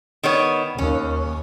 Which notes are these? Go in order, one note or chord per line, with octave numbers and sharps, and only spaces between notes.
D#3 B3 C#5
D#2 C#4